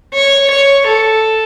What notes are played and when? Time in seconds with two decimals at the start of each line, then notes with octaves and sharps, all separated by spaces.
0.14 C#5
0.50 C#5
0.87 A4